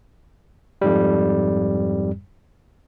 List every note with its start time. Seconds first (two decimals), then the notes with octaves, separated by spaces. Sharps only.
0.82 F2 G#2 G3